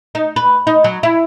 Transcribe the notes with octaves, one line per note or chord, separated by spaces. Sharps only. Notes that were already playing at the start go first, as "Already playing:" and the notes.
D#4
B4
D#4
F#3
E4